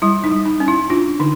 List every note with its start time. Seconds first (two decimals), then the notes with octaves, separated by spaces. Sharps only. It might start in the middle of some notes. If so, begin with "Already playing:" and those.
0.02 G3 E4
0.24 D#4
0.32 G3
0.46 D#4
0.60 C#4
0.68 E4
0.90 D4 F4
1.20 D3 D#4